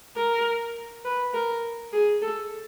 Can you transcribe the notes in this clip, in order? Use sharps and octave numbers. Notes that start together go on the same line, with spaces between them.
A#4
B4
A#4
G#4
A4